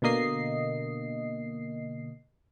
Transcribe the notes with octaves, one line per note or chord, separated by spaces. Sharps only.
B2 D3 A#3 D#5 C7